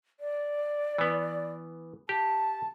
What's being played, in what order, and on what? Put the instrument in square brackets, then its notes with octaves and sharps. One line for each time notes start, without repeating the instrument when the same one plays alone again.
[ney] D5
[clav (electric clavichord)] E3 B3
[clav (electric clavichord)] G4 [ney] A5